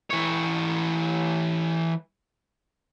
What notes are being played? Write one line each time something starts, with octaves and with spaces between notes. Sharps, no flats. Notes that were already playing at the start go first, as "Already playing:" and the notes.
E3 C#5